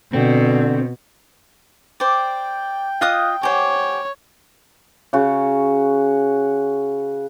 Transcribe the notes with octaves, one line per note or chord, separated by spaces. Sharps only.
B2 D3 C4
C5 D5 G5
F4 D#5 F5 D#6 F6 F#6
G4 C5 C#5 F#5 G#5
C#3 F#4